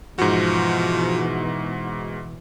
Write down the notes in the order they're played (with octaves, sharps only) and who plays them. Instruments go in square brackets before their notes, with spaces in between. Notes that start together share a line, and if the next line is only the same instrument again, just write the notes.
[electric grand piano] G#2 F#4 [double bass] B2 E3 [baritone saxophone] F3